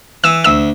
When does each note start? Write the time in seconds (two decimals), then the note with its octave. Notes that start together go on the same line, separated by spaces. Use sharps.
0.24 E3 E6
0.44 D2 E6